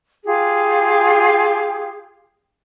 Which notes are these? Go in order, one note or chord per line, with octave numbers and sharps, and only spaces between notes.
F4 G4 G#4